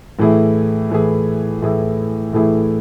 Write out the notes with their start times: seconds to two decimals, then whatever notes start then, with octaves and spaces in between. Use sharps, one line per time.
0.19 A2 E3 A3 E4 G#4
0.90 A2 E3 A3 E4 G#4
1.62 A2 E3 A3 E4 G#4
2.33 A2 E3 A3 E4 G#4